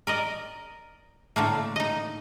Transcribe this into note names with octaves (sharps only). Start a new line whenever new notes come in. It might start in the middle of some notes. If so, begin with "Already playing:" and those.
A#4 D5 D#5
A2 D3 A3 A#3
D#4 D#5